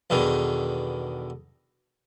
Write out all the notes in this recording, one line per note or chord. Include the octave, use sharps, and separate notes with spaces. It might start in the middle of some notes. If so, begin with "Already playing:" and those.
E2 B2 D3 D#3